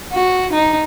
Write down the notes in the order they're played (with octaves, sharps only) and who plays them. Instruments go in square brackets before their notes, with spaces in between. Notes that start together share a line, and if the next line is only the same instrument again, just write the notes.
[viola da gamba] F#4
D#4